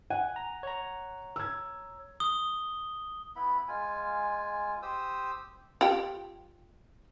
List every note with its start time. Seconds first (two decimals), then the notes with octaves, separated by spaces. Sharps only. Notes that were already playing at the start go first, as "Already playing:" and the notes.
0.10 F#5 G#5
0.36 A#5
0.63 C#5 A#5
1.36 E6 G#6
2.20 D#6 G7
3.36 B3 E4 B5
3.68 G#3 F4 G#5
4.82 G4 C5 D#6 E6
5.81 F4 G4 G5